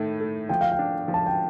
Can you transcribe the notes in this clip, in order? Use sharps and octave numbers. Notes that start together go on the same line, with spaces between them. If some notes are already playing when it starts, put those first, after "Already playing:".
Already playing: A2 D#3 A3
A3
F3 G5
F5
G5
D4
F3
A5
G5